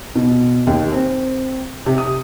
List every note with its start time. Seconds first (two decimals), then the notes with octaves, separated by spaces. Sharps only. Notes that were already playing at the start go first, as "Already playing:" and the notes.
0.15 B2
0.67 D#2
0.92 C4
1.86 C3
1.98 D#6